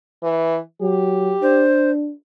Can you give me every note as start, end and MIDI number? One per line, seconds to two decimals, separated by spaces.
0.23 0.58 52
0.81 1.36 54
0.81 1.66 67
1.42 2.13 62
1.42 1.91 72